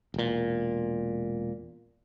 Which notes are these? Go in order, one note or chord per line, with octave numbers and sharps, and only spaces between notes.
E1 A#2